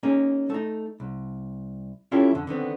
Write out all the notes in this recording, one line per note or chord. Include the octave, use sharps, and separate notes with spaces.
A#3 C#4 D#4 G#4
A3 D#4
C2
C#4 E4 F4 G4 A4 C#5
F2 D3
D3 D#3 B3 C4